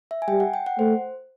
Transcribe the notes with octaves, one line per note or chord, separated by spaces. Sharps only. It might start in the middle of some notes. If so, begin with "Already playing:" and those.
E5
G#5
G3 G5
F#5
G5
F#5
A3 C5